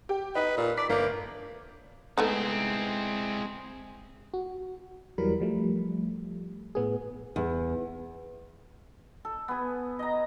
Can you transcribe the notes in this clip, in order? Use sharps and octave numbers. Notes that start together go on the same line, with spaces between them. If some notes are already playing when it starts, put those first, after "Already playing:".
G4
D#4 B4
A#2
D5 B6
G1 A#3
G#3 A3 B3 C4 D#4 E4
F#4
E2 E3 F#3 G3 A#4 B5
F3 G3 A3
A2 B3 G#4
E2
A4
B3 G#4
D#5 A#5